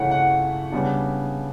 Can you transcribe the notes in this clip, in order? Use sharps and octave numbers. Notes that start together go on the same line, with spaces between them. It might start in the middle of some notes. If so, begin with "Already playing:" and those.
Already playing: C#3 E3 A3 C#4 F#5
F#5
C#3 G3 B3 D4